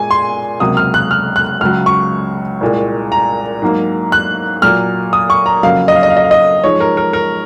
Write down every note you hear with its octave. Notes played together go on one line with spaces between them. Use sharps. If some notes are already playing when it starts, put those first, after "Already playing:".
Already playing: A#2 G#3 G#5
C6
C#2 C3 F#3 A#3 D#6
F6
F#6
F6
F#6
C#2 C#3 F#3 F6
C#6
C2 A#2 G#3
A#5
G#2 F#3 A#3
F#6
A#2 F#3 A#3 F6
D#6
C#6
A#5
F2 C#3 F#3 A#3 F5
D#5
F5
D#5
F5
D#5
F5
D#5
G#2 F3 G#3 C#5
A#4
A#4
A#4